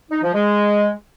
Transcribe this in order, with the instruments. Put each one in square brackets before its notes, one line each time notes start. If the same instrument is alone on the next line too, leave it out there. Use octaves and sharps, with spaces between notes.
[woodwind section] D#4
F3
G#3